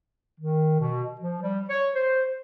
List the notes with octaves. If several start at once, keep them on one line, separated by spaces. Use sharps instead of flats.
D#3
B2
F3
G3
C#5
C5